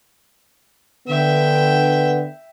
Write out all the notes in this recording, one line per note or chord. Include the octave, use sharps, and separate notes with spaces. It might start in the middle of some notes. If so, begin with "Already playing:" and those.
D3 B3 E5 G5